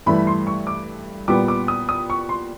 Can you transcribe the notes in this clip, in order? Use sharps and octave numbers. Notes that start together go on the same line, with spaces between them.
G2 E3 A3 B5
C6
C#6
D6
A#2 G3 B3 D6
D6
D#6
D#6
C#6
C6